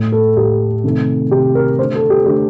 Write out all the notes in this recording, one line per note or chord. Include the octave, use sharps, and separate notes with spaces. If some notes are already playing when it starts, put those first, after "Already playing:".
Already playing: A2 A3
A4
A2 A3 G4
C3 D#3 A3
C3 D#3 A3 G4
A#4
D3 A3 C5
A4
G4
D3 A3 G4